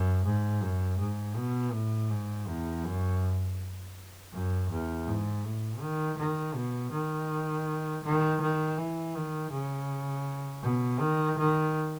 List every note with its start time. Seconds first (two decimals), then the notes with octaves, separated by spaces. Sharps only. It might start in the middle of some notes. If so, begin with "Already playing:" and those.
Already playing: F#2
0.25 G#2
0.61 F#2
0.99 G#2
1.36 B2
1.72 A2
2.10 G#2
2.48 E2
2.84 F#2
4.32 F#2
4.70 E2
5.07 G#2
5.44 A2
5.81 D#3
6.17 D#3
6.54 B2
6.92 D#3
8.04 D#3
8.41 D#3
8.78 E3
9.15 D#3
9.51 C#3
10.63 B2
11.00 D#3
11.38 D#3